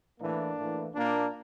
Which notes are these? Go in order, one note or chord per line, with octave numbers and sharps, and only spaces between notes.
A2 E3 A#3 D4
A2 E3
A#2 A#3 D4